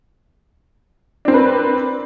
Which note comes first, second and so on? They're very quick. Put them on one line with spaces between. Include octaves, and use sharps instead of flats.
D4 C4 A#4 B4